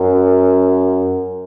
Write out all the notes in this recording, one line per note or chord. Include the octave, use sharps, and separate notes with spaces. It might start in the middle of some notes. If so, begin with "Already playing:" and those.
Already playing: F#2